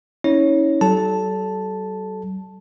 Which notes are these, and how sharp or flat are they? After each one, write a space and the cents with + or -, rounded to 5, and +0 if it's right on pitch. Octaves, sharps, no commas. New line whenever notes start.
C#4 +5 E4 -40 C#5 +0
F#3 +45 A4 -20 A5 +0